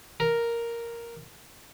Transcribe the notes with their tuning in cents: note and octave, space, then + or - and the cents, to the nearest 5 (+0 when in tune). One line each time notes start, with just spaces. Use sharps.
A#4 +0